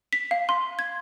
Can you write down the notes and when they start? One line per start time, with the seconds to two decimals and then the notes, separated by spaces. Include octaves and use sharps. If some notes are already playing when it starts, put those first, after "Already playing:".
0.13 B6
0.31 F5
0.49 C6
0.79 G#6